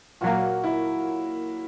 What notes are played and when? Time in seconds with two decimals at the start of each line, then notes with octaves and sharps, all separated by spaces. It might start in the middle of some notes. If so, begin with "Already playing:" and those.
0.21 A#2 F#3 A#3 F#4
0.64 E4